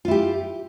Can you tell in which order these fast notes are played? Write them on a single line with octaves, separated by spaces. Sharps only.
F4 E4 G4